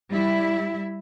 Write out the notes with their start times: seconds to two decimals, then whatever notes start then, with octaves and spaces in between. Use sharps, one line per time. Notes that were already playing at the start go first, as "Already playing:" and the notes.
0.10 G3 E4 E5